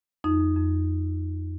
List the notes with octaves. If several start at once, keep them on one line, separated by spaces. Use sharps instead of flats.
F2 D#4
F2
F2